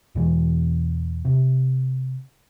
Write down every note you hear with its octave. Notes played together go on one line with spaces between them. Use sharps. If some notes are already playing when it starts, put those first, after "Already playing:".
E2 B2 E3
C3